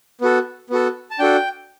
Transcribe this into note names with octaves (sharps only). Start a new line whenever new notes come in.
B3 F#4 A4
B3 F#4 A4
A5
D4 F#4 A4 G5